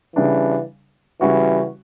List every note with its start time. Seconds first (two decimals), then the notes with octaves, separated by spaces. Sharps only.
0.15 C#3 E3 G3 D4
1.21 C#3 E3 G3 C#4 F#4